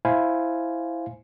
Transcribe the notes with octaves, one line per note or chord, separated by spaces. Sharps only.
E4 C5 F5 G#5